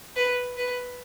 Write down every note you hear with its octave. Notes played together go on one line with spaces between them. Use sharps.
B4
B4